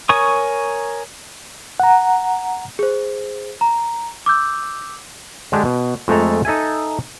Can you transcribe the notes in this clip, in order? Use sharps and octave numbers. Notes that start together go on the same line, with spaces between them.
A#4 C#5 G#5 C#6 D#6
F#5 A#5
G#4 C5
A#5
D6 E6 G6
D3 G#3 D4 G4
B2
F2 G#3 A3 A4 A#5
D#4 A4 E5 G#5